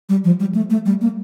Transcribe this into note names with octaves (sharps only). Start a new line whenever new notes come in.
G3
F3
G3
A3
A3
G3
A#3